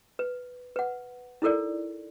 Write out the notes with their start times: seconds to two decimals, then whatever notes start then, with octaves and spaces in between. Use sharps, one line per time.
0.19 B4
0.76 B4 F#5
1.42 D#4 E4 A4 A#4 D5